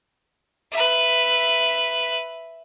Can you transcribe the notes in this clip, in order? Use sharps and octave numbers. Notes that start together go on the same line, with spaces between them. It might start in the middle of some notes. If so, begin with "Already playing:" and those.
B4 E5